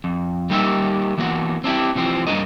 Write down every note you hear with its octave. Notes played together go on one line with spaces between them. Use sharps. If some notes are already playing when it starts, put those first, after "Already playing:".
F2
G3 A#3 D#4 G4 A#4 E5
E3 A#3 B3 F#4
C4 D4 E4 G4
C3 E3 F3 C4
G2 A#3 D4 G4 A#4 D#5